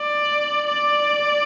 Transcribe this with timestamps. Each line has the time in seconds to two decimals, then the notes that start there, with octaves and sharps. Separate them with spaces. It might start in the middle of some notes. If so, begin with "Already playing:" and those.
Already playing: D5
0.67 D5